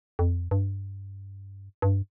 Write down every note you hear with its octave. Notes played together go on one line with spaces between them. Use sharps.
F2
G2
G2